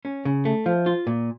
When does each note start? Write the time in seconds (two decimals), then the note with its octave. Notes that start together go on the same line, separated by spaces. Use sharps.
0.05 C#4
0.25 C#3
0.45 A3
0.66 F3
0.86 F4
1.07 A#2